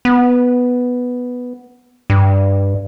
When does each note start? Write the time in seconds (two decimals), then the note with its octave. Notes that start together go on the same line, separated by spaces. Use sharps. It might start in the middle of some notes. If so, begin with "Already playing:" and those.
0.05 B3
2.10 G2